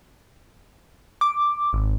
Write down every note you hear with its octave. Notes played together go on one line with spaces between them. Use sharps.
D6
G#1